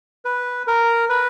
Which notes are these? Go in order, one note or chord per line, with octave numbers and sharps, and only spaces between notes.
B4
A#4
B4